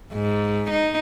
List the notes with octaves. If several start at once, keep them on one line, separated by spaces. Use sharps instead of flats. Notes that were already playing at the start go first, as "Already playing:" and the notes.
G#2
D#4